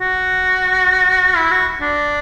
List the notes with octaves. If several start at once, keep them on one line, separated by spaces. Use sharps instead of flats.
F#4
E4
F#4
D4